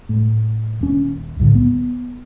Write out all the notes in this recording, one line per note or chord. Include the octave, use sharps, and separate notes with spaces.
A2
D#1 C#4
C2 A2 D3
B3